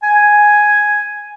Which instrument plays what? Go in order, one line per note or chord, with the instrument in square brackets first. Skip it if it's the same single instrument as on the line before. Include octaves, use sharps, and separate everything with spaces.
[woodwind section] G#5